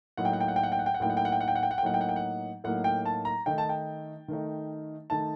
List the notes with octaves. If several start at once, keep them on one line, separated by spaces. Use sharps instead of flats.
A2 F#3 A#3 D#4 F#5
G5
F#5
G5
F#5
G5
F#5
G5
F#5
G5
F#5
A2 F#3 A#3 D#4 G5
F#5
G5
F#5
G5
F#5
G5
F#5
G5
F#5
G5
A2 F#3 A#3 D#4 F#5
G5
F#5
G5
F#5
A2 F#3 A#3 D#4 F#5
G5
A5
A#5
D#3 A3 D#4 G5
A5
G5
D#3 A3 D#4
D#3 A3 D#4 A5